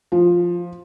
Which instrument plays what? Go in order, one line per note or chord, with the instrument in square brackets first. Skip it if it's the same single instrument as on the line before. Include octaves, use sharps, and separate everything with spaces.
[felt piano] F3